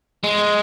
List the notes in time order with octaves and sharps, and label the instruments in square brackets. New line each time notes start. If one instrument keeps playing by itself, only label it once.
[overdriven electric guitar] G#3